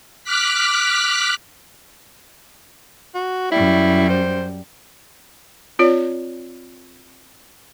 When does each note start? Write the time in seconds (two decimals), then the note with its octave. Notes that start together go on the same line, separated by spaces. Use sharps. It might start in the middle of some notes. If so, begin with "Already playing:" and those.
0.24 D6 F6 F#6 B6
3.15 F#4
3.52 F#2 G3 E4
4.10 C5
5.79 C4 F4 C#5 D5